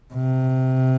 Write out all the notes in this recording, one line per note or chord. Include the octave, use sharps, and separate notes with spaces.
C3